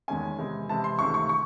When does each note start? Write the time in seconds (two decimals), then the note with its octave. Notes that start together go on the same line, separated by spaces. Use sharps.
0.08 E2 D#3 G#3 C#4 G#5
0.38 C3 E3 G#3
0.69 C3 E3 G#3 A5
0.84 C6
0.99 C#2 C3 D#3 A3 C#6
1.14 C#6
1.29 C#6